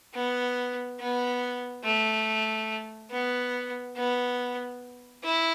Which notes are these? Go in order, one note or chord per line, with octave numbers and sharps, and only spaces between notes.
B3
B3
A3
B3
B3
E4